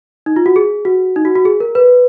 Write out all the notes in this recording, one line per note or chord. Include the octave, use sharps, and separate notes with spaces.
D#4
F4
F#4
G#4
F#4
D#4
F#4
F#4
G#4
A#4
B4